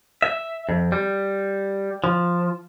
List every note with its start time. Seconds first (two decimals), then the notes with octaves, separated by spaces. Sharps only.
0.22 E5
0.69 F2
0.92 G3
2.04 F3